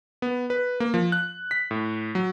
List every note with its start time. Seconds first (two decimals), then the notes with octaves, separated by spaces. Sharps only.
0.22 B3
0.50 B4
0.80 A#3
0.94 F3
1.12 F#6
1.51 B6
1.71 A2
2.15 F#3